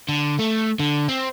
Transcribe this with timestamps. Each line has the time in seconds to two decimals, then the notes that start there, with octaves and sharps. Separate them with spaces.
0.09 D3
0.39 A3
0.79 D3
1.08 C4